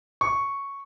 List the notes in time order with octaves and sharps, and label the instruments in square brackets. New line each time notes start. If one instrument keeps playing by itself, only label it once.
[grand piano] C#6